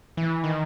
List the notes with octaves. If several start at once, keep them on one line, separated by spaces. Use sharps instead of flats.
E3
D#3